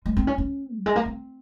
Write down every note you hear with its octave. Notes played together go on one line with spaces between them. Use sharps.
G#3
C4
C#4
C#4
F#3
G#3
A#3
C4